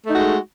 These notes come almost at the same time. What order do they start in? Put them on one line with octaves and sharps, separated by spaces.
A3 D#4 F#4 G#3